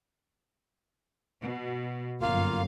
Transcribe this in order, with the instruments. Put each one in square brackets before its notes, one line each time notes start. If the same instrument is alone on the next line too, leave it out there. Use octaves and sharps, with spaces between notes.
[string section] B2
[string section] G1 F#2 F5 [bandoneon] A#3 F4